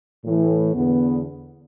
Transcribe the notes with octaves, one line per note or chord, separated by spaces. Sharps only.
A2 E3
E2 D3 B3